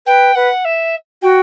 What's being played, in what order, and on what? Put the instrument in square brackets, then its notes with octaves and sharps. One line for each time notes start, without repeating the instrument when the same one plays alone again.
[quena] B4 [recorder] G5
[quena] B4 [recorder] F#5
[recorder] E5
[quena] F#4 [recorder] G5